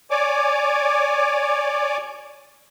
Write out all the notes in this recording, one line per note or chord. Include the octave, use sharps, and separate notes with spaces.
C#5 D5 G#5 D6